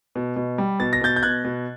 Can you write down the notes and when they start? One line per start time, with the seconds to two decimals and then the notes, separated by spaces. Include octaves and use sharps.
0.15 B2
0.36 B2
0.58 G3
0.80 B2 A6
0.93 A#6
1.01 B2 G6 A6
1.16 G6
1.23 B2 F#6 G#6
1.44 B2